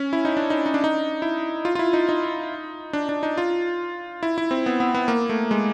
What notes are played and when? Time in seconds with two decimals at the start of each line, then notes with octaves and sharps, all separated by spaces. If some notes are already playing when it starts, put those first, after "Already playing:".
Already playing: C#4
0.13 E4
0.25 D#4
0.37 D4
0.50 D#4
0.66 D#4
0.74 D4
0.84 D#4
1.22 E4
1.65 F4
1.75 F4
1.79 E4
1.93 D#4
2.09 D#4
2.93 D4
3.09 D4
3.23 D#4
3.38 F4
4.23 E4
4.38 E4
4.51 C4
4.66 B3
4.80 B3
4.95 B3
5.08 A#3
5.29 A3
5.51 G#3